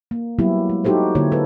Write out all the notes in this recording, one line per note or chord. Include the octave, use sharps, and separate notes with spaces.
A#3
F#3 G3 A#3 B3 E4 G4
G#3
D#4 F#4 G4 A4 C5
D3 A#3 E4 C#5
A4 B4